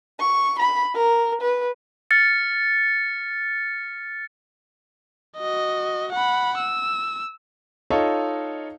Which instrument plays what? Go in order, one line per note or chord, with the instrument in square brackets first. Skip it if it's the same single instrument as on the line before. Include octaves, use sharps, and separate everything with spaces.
[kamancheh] C#6
B5
A#4
B4
[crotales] F6 A6 C#7
[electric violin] F#4 D#5
F#5 B5
E6
[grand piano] D#4 F4 A4 C#5 D#5 F5